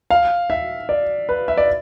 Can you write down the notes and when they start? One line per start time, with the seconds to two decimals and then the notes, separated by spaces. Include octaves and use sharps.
0.10 F5
0.50 E5
0.89 D5
1.29 B4
1.48 E5
1.57 D5